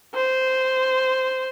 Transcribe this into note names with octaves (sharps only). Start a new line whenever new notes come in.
C5